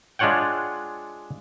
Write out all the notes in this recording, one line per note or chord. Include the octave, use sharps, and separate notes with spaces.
G#3 D4 F4 C#5 F#5 G5